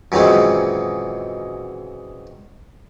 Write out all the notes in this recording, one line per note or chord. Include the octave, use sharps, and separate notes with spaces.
F#2 A#2 D#3 E3 G#3 C4